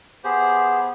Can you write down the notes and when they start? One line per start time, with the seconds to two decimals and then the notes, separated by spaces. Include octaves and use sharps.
0.24 B3 G4 G#4 C5